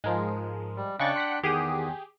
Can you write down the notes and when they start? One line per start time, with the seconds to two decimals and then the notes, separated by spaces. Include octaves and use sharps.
0.04 G#2 F3 G#3 A#4
0.77 G3
1.00 C#3 D4 D#5 G5 C#6 F#6 A6
1.16 F#5 C6 B6 C#7
1.43 E2 D#3 G4 G#4 F#5 D#6